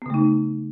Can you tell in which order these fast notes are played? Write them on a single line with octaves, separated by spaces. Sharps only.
B3 C#3 A3 D#4